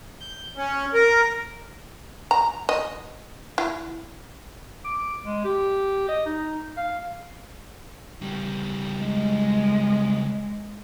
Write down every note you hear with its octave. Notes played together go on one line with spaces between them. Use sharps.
G6
C#4
A#4
A#5
D#5
E4
D6
G#3
G4
D#5
D#4
F5
C#3 G3
G#3